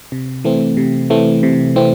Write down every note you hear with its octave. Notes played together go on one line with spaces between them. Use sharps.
C3
E3 A3 C4
C3
E3 A3 C4
C3
E3 A3 C4